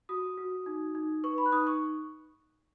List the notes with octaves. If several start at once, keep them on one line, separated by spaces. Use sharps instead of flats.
F#4 D#6
F#4
D#4
D#4
B4 C#6
B5
F#6
D#4 D#6
C#6